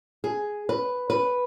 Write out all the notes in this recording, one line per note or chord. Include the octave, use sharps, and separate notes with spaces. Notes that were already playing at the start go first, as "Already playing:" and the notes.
G#4
B4
B4